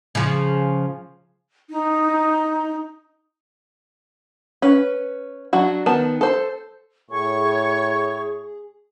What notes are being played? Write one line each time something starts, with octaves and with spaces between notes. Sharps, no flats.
C#3 F3
D#4
C#4 B4
F#3 D4 F#4
D#3 B3 A5
A4 C5
A2 G#4 C#5 C#6